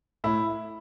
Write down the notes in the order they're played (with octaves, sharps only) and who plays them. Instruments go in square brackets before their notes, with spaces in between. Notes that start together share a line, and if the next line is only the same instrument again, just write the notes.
[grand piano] A2 E4